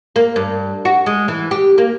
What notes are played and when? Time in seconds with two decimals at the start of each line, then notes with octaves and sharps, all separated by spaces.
0.16 A#3
0.36 G2
0.85 F#4
1.06 G#3
1.28 E3
1.51 G4
1.78 A#3